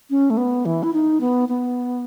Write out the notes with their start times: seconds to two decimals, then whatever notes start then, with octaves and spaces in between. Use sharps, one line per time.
0.10 C#4
0.30 A3
0.37 B3
0.65 E3
0.83 E4
0.93 D#4
1.21 B3
1.49 B3